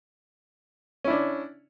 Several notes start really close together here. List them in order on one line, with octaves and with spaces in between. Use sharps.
C#4 E4 D4